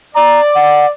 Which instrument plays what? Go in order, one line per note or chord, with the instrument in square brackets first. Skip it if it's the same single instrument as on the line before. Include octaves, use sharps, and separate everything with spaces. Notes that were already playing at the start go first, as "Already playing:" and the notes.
[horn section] D5 [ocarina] A#5
[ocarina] F#5